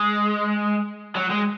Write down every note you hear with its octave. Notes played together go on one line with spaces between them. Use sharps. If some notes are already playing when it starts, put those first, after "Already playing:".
Already playing: G#3
F#3
G#3